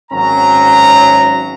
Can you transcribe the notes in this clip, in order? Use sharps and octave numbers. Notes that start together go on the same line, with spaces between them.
G#1 F#3 C#4 A#5